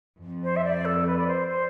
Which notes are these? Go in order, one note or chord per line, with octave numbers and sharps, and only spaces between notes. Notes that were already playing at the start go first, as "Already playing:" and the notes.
F2
C5
E5
D5
A4
B4
D5
C5
C5